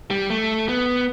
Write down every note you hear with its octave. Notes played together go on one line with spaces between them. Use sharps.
G3
A3
B3